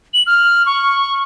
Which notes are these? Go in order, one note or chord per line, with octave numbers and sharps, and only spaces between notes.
F#7
F6
C#6